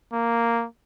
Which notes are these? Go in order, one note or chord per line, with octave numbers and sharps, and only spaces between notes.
A#3